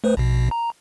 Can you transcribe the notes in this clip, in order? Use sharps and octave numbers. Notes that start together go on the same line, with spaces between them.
A3 B4 C5
A#1 B2
A#5